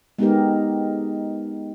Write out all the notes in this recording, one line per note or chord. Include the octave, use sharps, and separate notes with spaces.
G#3 B3 D#4 G4 A#4